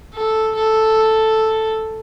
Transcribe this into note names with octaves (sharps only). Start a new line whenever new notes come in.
A4
A4